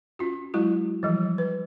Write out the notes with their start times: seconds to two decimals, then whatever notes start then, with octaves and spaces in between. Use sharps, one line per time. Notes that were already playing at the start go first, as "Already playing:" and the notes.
0.19 C#4 F4 F#4
0.54 F#3 G#3 E4 F#4
1.03 E3 F3 G3
1.38 B4